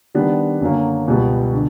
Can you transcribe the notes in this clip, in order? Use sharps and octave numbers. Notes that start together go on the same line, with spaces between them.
D#3 G3 B3 D4
F#2 D3 F#3 A#3
C#2 B2 G3 B3
D3